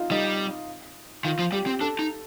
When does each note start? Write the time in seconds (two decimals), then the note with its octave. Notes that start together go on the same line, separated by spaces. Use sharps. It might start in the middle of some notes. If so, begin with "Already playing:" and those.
Already playing: D#4 F4
0.11 G3 D#4
1.24 D#3 F4
1.39 F3
1.52 G3 G4
1.67 C4
1.81 D4 A4
1.99 D#4